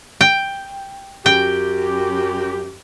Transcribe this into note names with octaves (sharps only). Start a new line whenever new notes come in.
G5
F#2 G4 G5